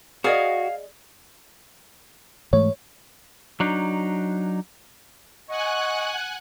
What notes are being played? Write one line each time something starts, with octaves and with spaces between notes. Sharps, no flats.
F#4 G#4 D5 D#5 F5 G#5
G#2 E3 A3 C#5
F#3 D4 D#4
D#5 F#5 G#5 C#6 F#6